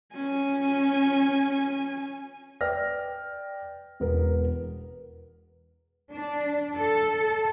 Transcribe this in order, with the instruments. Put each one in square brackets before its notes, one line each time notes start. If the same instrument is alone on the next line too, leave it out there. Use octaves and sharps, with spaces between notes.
[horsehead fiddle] C#4 G#5
[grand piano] B4 D5 G5 F6 A#6
E1 B3 A#4
[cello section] D4
A4